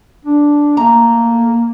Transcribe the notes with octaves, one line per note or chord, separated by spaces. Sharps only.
D4
A3 A#3 A#5